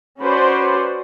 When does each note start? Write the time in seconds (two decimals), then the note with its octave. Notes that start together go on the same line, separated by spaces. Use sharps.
0.19 C#4 F#4 B4 C5 D5